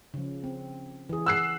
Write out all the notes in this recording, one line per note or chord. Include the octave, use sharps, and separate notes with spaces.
C#3 F3
C4
E3 G#4
F#5 E6 F#6 C7